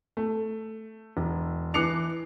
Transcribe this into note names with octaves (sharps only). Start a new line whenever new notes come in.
A3
E1
E3 D6 F#6 C7 C#7 F7